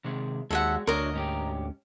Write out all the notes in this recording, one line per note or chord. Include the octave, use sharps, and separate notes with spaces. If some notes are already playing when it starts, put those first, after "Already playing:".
C3 D#3 G#3
D#2 G#3 F#4 A4 E5 F#5
D2 D4 F#4 A#4 C#5 D#5
G#2 C#4 G4